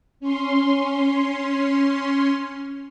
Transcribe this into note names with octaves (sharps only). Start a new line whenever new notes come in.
C#4 C6